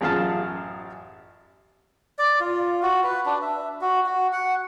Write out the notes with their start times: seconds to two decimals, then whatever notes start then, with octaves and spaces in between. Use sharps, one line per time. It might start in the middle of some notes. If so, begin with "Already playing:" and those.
0.01 A1 F#2 F4 G#4 F5 A5
2.19 D5
2.40 F4
2.82 F#4
3.04 B4
3.26 D4
3.42 E5
3.81 F#4
4.06 F#4
4.33 F#5